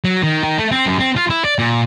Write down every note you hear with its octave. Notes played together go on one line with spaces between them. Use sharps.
F#3
D#3
D#3
A3
C4
F#2
C4
F4
E4
D5
A#2